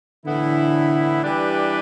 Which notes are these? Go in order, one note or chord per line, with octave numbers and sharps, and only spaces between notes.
A2 D3 E3 B3 E4
E3 G3 D4 G4 B4